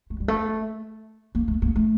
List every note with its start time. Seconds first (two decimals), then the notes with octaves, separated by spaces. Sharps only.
0.10 A3
0.20 G3
0.28 A3
1.35 A#3
1.48 A3
1.62 A#3
1.76 A3